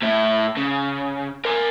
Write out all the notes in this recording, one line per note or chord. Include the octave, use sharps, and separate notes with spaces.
A2 E4
C#3
A#4 G#5